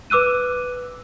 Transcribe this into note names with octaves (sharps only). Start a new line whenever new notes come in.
B4 D6 E6 F#6 D#7